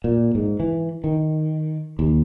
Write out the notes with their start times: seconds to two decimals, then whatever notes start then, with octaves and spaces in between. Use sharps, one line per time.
0.04 A#2
0.35 G#2
0.60 E3
1.04 D#3
1.99 D#2